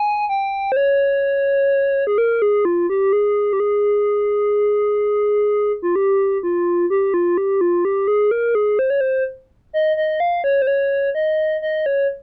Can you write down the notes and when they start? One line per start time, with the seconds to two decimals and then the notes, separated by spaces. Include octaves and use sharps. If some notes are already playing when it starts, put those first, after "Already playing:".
Already playing: G#5
0.29 G5
0.72 C5
0.77 C#5
2.07 G#4
2.18 A#4
2.42 G#4
2.65 F4
2.90 G4
3.13 G#4
3.53 G4
3.60 G#4
5.82 F4
5.96 G4
6.43 F4
6.90 G4
7.14 F4
7.38 G4
7.61 F4
7.85 G4
8.08 G#4
8.31 A#4
8.55 G#4
8.79 C5
8.90 C#5
9.01 C5
9.73 D#5
9.97 D#5
10.20 F5
10.44 C#5
10.62 C5
10.67 C#5
11.15 D#5
11.62 D#5
11.86 C#5